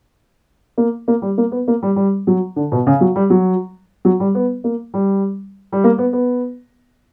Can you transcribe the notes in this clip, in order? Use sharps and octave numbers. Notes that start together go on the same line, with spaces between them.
A#3
A#3
G3
A#3
B3
A#3
G3
G3
F#3
D3
B2
C#3
F#3
G3
F#3
F#3
G3
B3
A#3
G3
G3
A#3
B3
B3